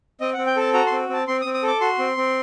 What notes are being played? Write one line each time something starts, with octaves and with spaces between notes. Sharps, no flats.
C4 D#5
C4 F#5
G5
A4 A5
F#4 A#5
C6
C4
C4 A5
C4 C6
D#6
C4
D#6
A4
D6
F#4 C6
C4
C4